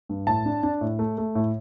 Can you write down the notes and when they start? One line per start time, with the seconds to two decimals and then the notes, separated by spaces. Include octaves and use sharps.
0.09 G2
0.27 A2 A5
0.45 D4
0.63 D4
0.81 A2
0.99 A3
1.18 A3
1.35 A2